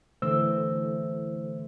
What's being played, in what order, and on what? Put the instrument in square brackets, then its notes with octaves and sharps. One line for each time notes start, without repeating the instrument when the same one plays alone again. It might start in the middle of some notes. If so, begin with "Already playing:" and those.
[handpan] D3 E3 A3 [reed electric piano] C5 E6